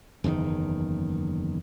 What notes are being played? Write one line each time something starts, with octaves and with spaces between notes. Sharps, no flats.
F#1 E2 C3 D#3